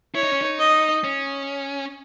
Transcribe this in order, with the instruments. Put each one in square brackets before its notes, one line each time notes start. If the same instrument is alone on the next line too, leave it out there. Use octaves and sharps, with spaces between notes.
[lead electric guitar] E4 [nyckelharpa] C#5
[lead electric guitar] D#4
C#4
D#4
[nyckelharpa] D#5
[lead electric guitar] C#4